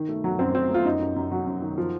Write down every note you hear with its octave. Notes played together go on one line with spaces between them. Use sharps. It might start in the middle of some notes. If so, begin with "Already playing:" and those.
Already playing: D#3
A3
F#3
F#2 C4
A3 C4
A3 F4
F#2 D#4
F#2
F#2
F#3
F#2
D#3
F3